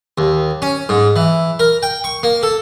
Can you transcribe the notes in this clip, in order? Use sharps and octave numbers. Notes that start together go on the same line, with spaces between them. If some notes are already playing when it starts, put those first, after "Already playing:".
D#2
C#4
G#2
E3
A#4
G5
C#6
A#3
A4